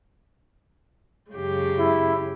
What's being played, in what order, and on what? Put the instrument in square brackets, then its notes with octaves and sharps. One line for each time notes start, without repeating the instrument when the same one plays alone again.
[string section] F#2 C#3 [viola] G#3 G4
[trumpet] E4